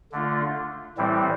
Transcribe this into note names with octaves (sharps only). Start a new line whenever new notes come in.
D3 A3 D4 F4
A2 E3 G3 C4